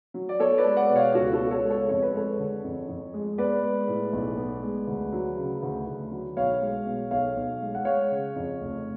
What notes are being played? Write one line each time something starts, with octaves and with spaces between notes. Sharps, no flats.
F#3
D5
B3 A4 C#5
B4 D5
G#3
D5 F#5
B2
C#5 F5
C#2 F#4 A4
F#4 A4
B3
A4 C#5
G#3
A4 C#5
F2 C#5
B4
G#3 A4 C#5
D3
F2
F2
G#3
B3 B4 D5
G#3
A2
B1
B3
G#3
D2
F#3
C#3
D2
D2
F#3
B1 C#5 F5
G#3
B2
B1 C#5 F5
B1
G#3
F#5
G#3 C#5 F5
C#3
F2
F1